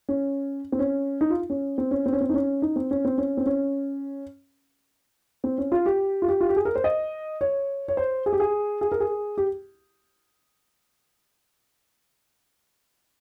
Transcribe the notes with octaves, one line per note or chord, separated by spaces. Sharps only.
C#4
C4
C#4
D#4
F4
C#4
C4
C#4
C4
C#4
C4
D#4
C#4
D#4
C4
C#4
C4
C#4
C4
C#4
C4
C#4
F4
G4
F4
G4
F4
G4
G#4
A#4
C5
D#5
C#5
C#5
C5
G#4
G4
G#4
G#4
A#4
G#4
G4